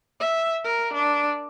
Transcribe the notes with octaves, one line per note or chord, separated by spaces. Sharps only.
E5
A#4
D4